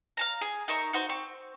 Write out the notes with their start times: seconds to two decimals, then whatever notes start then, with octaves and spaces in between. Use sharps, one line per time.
0.17 F5 A5 A#5
0.41 G#4
0.68 D#4 A#4 E5 C#6
0.93 D#4 F#4 C5
1.09 C4 C#6